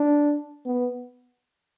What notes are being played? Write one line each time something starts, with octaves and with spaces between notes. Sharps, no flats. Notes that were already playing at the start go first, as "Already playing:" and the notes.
Already playing: D4
B3